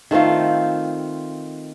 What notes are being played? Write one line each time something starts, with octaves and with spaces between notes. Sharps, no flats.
D#3 A3 C4 F4